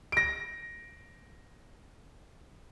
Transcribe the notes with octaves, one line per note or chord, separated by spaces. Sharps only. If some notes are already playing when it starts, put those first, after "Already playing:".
A#6 D7